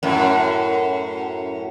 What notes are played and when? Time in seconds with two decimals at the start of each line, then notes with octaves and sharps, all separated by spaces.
0.03 F#2 A2